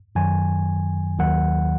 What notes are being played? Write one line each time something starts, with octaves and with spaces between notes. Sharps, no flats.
F#2 D#3 F#3 G#5
D#2 D#3 F#3 F#5